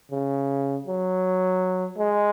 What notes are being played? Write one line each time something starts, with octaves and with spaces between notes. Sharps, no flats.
C#3
F#3
G#3